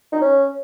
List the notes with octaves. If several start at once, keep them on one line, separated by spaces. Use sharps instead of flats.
D#4
C#4